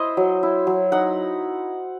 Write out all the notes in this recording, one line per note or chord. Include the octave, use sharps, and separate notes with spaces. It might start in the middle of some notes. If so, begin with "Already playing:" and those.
Already playing: E4 C5 D#5
F#3
E4
F#3
D#4 F#5